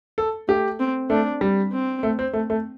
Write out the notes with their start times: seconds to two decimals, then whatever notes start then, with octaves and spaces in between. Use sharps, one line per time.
0.18 A4
0.48 A3 G4
0.80 C4
1.10 A3 D4
1.41 G3
1.72 C4
2.03 A3
2.19 C4
2.33 A3
2.50 A3